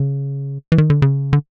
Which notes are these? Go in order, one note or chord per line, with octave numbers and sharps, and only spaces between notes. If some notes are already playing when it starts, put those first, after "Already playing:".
Already playing: C#3
E3
D#3
D3
C#3
D3